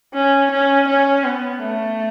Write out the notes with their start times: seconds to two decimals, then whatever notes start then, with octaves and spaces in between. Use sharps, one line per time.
0.14 C#4
0.51 C#4
0.87 C#4
1.24 B3
1.61 A3